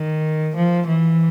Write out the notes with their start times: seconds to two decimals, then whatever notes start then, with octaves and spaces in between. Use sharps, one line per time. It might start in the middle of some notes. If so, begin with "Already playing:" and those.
Already playing: D#3
0.56 F3
0.87 E3